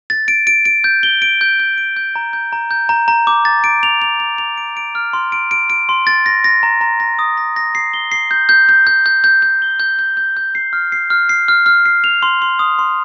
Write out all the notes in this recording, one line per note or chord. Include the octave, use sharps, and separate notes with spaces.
A6
D7
D7
D7
G6
G7
D7
G6
G6
D7
G6
A#5
G6
A#5
G6
A#5
A#5
D6
A6
D7
F7
F7
F7
F7
D7
D7
F6
C6
D7
D7
D7
C6
A6
A#6
A#6
A#5
A#5
A#6
D#6
A#6
A#6
C7
G7
C7
G6
G6
G6
G6
G6
G6
G6
G7
G6
G6
G6
G6
C7
F6
C7
F6
C7
F6
F6
C7
F7
C6
C6
D#6
C6